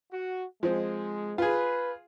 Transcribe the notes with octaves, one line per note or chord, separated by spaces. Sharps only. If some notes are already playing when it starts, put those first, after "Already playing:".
F#4
F3 G#3 C4
F4 G#4 B4